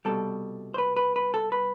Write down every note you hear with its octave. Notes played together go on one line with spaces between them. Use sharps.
C2 B2 G3 A4
C5
B4
B4
B4
A4
B4